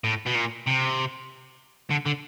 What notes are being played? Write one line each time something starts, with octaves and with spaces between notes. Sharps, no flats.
A2
B2
A#2
C3
D3
D3